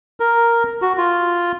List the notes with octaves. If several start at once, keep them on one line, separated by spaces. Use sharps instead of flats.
A#4
F#4
F4